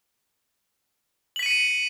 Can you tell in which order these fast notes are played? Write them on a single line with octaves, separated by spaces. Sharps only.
F#7 B6 D#7 C#7